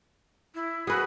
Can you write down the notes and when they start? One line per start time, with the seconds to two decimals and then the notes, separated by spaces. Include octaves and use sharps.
0.55 E4
0.87 F#4 G#4 B4